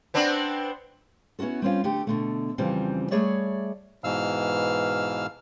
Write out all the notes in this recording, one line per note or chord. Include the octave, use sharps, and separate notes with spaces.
B3 C4 D4
B3 C#4 E4 F#4 A4
G3 C4 C#4 F4
D3 A3 G4
B2 D3 A3
F2 C#3 E3 F3 G3 C4
G3 A3 G#4 C#5 D5 E5
G#2 B2 E3 F5 E6 F6